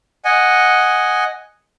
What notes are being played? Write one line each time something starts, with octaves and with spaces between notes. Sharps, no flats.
D#5 F#5 G#5